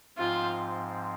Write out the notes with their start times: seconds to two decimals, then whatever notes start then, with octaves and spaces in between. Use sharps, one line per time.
0.18 G#2 F3 C4 F4